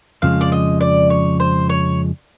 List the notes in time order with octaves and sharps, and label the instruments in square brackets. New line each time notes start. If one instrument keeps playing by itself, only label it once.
[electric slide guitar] F2 C#3 F3 G#3 [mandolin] F5
[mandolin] D5
D#5
D5
C#5
C5
C#5